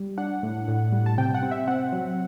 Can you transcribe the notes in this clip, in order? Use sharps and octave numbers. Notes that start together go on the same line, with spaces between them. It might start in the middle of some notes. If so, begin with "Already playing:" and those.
Already playing: G3
D4 F#5
A2
A2
G3
A5
C3 G5
F#5
C4
E5
C4 F#5
F#3